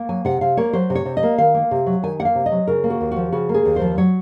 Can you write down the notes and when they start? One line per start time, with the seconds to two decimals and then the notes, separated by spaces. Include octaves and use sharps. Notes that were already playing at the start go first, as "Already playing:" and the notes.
Already playing: A#3
0.09 F#3 G#5
0.25 C3 F#5
0.41 C3 F5
0.57 A#3 C#5
0.73 F#3 C5
0.90 C3
0.95 C#5
1.05 C3
1.17 D#5
1.23 A#3
1.38 D#3 F5
1.54 A#3
1.71 C3
1.86 F#3
2.03 D#3 G#5
2.19 A#3 F#5
2.25 F5
2.35 C3
2.46 D#5
2.52 F#3
2.67 C#3 A#4
2.84 A#3
2.90 F#4
3.00 D#2
3.11 F3 F#4
3.32 C#3 F#4
3.49 A#3
3.54 G#4
3.65 D#2
3.76 C5
3.81 F3
3.98 F#3 C#5